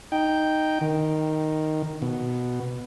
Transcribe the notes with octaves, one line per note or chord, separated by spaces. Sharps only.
D#4 G5
D#3
B2